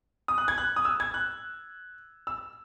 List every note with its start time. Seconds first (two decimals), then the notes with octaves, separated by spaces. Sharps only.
0.28 D#6
0.38 F#6
0.48 G#6
0.58 F#6
0.76 D#6
0.85 E6
1.00 G#6
1.14 F#6
2.27 E6